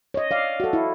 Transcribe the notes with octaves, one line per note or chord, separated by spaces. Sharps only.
C#5 D#5
D5 F5
F#4 A4
E4